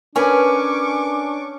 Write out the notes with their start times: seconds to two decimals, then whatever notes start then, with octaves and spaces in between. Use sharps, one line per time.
0.16 C#4 D4 A#4 B4 G#5 C#6 D6